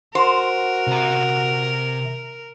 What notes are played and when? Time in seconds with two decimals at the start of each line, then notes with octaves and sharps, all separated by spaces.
0.15 F#4 A#4 C5
0.87 C3 A#5